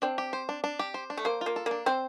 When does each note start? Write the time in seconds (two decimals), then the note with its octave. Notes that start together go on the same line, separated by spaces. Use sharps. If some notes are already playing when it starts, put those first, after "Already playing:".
0.02 C4 D4
0.18 G4
0.33 C5
0.49 D4
0.64 D4
0.79 G4
0.94 C5
1.10 D4
1.17 A3
1.25 A#3 C5
1.41 A#3 F4
1.56 A4
1.66 A#3
1.71 D4
1.86 C4 C5